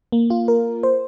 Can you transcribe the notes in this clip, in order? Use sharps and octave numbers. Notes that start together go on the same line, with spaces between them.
A#3
F4
A#4
C5